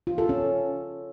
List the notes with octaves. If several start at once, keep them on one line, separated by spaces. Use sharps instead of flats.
F4
A4
C#4